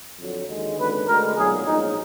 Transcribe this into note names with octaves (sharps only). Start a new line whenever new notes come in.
F2 D3 F#3
D#2 D3 G#3
G#1 F#2 D3 B4
D2 D3 G#3 A#4
B1 A#2 F#3 G#4
A#1 G#2 F#3 D#4